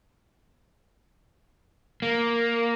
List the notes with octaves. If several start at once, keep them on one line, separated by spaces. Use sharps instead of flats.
A#3